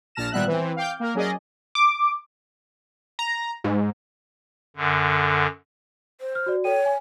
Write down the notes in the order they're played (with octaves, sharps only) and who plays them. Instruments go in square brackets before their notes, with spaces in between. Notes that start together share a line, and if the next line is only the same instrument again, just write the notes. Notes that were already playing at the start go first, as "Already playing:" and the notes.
[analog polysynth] A#1 A#2 A5 F6 A#6 E7
G#1 A#2 G3 B3 E5 F#6
E3 C4
F5 G5 D6 G6
A#3 A#4
F#3 C#4 G#4 D5 D#5
D6
A#5
G#2
[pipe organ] F#2 D3
[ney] C5
[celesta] F6
F#4 D5
[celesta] A4 G5 D#7 [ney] C#5
[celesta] G#5